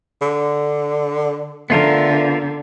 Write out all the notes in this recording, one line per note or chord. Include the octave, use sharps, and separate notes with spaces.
D3
D3 A3 B3 F4 A#4